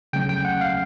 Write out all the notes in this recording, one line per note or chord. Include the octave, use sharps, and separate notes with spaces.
C#3 F#3 A3 C#4 G5
G5
F#5
F5